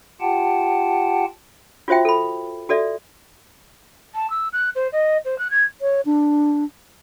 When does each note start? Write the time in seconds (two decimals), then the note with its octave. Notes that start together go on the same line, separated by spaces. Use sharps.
0.21 F4 G4 F#5 G5 A5
1.88 F4 F#4 C5 E5 G5
2.05 A4 B5
2.69 F#4 A4 D5 E5
4.14 A5
4.30 E6
4.52 F#6
4.75 C5
4.92 D#5
5.25 C5
5.38 F#6
5.50 G#6
5.81 C#5
6.06 D4